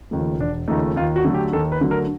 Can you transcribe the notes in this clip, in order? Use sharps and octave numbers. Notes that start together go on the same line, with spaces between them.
D#2 C#3 F3 A3
E1 D4
D#2 C#3 F3 A3 D#4
D#2 F4
F#4
D3 F#3 A3
G4
D#2 A4
B4
D3 F#3 A3
A#4